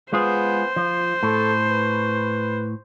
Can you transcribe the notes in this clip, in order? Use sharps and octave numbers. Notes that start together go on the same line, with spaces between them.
G#3 B3 F4 G#4 C5
F3 F4
A2 A4
B4